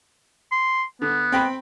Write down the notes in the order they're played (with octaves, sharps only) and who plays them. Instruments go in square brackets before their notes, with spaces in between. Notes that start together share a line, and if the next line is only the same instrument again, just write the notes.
[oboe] C6
[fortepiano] D3 [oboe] B3
[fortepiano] C4 G5 B5